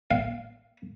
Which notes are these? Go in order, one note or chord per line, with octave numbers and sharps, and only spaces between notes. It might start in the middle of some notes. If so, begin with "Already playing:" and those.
F5